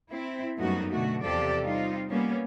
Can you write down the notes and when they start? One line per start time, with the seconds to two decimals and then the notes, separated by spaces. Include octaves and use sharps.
0.11 C4 E4
0.60 F#2 G3 A3 B3 D#4 F#4
0.92 B2 D3 A3 F#4
1.23 E2 C3 F3 G4 A4 D5
1.63 G3 C4 D#4 F4
2.10 G3 A#3 B3 C#4